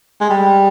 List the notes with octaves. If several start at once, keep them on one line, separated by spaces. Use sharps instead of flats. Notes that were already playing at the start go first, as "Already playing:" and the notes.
G#3
G3